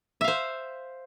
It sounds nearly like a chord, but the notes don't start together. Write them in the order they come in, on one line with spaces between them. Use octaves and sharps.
E5 F5 C5